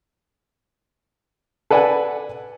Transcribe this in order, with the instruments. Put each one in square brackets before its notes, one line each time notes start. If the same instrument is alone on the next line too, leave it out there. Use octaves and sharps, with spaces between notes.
[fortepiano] A4 B4 D5 F#5 G#5